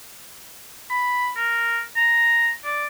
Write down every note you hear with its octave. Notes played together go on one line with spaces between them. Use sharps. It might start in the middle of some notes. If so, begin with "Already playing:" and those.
B5
A#4
A#5
D5